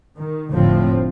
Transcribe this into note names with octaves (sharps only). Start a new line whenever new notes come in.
D#3
F1 A2 D3 F3 C4